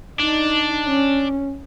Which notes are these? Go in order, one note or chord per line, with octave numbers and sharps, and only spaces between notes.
D4 D#4
C#4